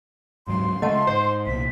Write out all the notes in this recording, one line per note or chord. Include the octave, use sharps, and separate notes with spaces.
D1 G#2 F#3 C6
C#3 G#3 A3 D#5 F#5 A5
G#2 C5
C2 A#2 B6